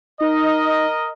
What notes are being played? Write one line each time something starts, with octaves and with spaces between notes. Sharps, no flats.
D#4 A#4 D#5